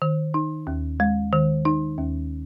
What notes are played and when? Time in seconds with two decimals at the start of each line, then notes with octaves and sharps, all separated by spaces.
0.02 D#3
0.34 D#4
0.67 D#2
1.00 G#3
1.33 D#3
1.65 D#4
1.98 D#2